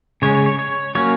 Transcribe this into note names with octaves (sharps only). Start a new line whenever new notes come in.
C#3 G#3 C#4 C#5
C#5
C#5
C#5
F#3 A#3 C#4 C#5